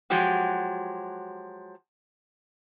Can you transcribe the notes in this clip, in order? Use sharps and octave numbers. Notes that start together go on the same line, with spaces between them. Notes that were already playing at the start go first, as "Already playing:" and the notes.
F3 F#3 G#3 F#4 G4